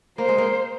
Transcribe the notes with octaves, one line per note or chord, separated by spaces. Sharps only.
A#3 C5
G#3
A#3